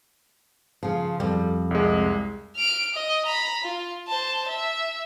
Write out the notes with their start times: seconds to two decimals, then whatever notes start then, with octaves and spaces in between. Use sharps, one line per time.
0.83 C#3 F3
1.20 F2 G3
1.71 C2 G#3
2.56 F6 D7
2.94 D#5
3.26 A#5 B5
3.64 F4
4.07 C5 A5
4.48 E5